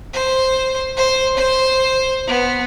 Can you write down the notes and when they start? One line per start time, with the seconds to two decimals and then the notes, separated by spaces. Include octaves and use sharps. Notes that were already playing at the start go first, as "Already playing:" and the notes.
0.13 C5
0.97 C5
1.36 C5
2.27 B3